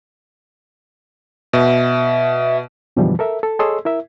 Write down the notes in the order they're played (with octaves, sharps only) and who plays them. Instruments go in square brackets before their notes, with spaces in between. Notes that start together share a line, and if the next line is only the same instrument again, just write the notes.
[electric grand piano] B2 [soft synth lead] E5
[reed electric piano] F#2 B2 D3 E3 F3 G3
A4 A#4 E5
A4
G#4 A4 C#5 D#5 C6 E6
E4 A#4 E5